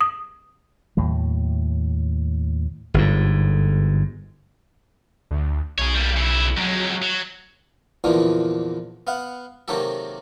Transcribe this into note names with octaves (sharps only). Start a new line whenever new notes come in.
D#6
D#2 A2 F#3
G1 G#2
D2
B1 G#4 C#5
G3 A#3
C#3 E4
F2 F#3 G#3
F#3
E2 A#2 D3 E3 F3 A#3
B3 F5 F#5
C3 D#3 F#3 A#3 G4 A4